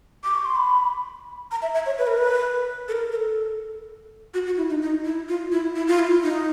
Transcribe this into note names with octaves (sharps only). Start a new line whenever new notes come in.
D6
C#6
C6
B5
A#5
E5
E5
C#5
B4
A#4
B4
A4
A#4
A#4
A4
F#4
F#4
E4
D#4
D#4
E4
F4
E4
E4
F4
E4
D#4